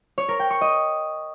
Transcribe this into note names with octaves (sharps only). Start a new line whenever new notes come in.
C#5
A#4
G5
C#6
D#5